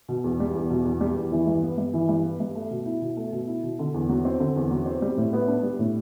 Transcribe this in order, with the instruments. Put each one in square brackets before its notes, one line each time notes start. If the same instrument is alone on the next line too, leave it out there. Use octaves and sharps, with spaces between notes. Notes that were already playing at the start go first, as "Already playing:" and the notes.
[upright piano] B2
E2
G3
E2
B2
E2
G3
E2
E3
G2
B3
G2
E3
G2
B3
G2
A3
B2
E4
B2
A3
B2
E4
B2
D3
E2
F#3
C4
D3
E2
F#3
C4
G3
A2
B3
D4
G3
A2